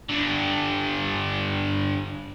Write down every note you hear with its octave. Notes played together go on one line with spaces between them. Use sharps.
G2 D3